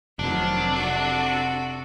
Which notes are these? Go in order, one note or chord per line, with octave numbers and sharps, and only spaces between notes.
F1 D#3 F#3 C4 D4
C3 F#4 A4